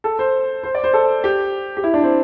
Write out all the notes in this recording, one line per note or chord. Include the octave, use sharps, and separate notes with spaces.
A4
C5
C5
D5
C5
A4
G4
G4
E4
D4
C4